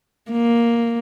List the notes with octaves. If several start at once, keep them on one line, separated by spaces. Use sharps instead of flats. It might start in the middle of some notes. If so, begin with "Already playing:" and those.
A#3